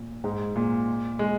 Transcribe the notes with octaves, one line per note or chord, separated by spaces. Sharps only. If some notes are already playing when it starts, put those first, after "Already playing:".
Already playing: A#2
G#2
A#2
G#3